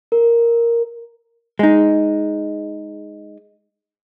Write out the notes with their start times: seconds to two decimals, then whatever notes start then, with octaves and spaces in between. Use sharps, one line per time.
0.12 A#4
1.59 G#3 D#4